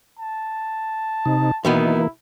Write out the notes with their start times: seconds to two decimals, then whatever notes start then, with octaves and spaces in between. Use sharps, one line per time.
0.19 A5
1.26 C3 D#4
1.65 B2 D#3 E3 A#3 B3 E4